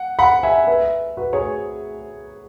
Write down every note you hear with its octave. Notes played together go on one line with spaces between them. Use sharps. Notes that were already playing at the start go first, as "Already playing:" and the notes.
Already playing: F#5
F#5 B5
E5 G#5
B4 E5
F#4 B4
G#4 C#5